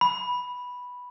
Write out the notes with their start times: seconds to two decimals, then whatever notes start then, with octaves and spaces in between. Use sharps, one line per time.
0.01 B5